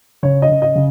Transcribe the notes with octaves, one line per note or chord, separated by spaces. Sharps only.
C#3 C#5
D#5
C#3
D#5
C#3